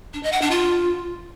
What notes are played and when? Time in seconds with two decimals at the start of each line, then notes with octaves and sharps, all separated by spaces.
0.14 D4
0.23 D#5
0.32 F#5
0.42 D4
0.51 F4